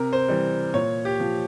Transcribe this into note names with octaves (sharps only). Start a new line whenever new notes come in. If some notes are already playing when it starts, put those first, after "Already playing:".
Already playing: C3 A#4
C5
E3 G3
A#2 C#5
G4
F3